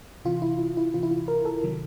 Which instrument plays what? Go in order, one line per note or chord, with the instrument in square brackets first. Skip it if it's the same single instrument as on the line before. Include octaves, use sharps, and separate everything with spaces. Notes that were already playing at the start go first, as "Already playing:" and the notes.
[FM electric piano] C3 E3 F4
E4
E4
E4
C3 E3 F4
E4
F4
A#4
A4
C3 D#3 F#3